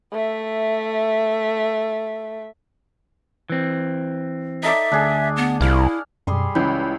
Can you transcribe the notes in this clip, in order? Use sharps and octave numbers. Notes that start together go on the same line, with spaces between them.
A3 E5
E3 C4
D#4 A4 D5 E5
D2 D4 G#4
B3
C2 E4 F5
F#2 B2 G3 G#4 C6
C#2 E3 C#4 C#5 B5 G6